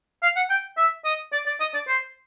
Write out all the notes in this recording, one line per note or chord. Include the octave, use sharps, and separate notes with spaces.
F5
F#5
G5
E5
D#5
D5
D5
D#5
D5
C5